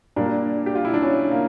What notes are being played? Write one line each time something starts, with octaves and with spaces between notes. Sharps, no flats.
A#2 G3 A#3 D4
G4
F4
E4
D4
C#4
A#3